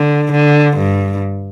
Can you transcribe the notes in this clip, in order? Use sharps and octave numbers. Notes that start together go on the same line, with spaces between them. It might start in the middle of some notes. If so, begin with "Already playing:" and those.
Already playing: D3
D3
G2